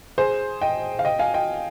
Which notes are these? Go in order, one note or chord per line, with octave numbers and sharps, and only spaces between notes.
G#4 C5
D#5 G5
F5
D#5 G5
F5 G#5
D#5 G5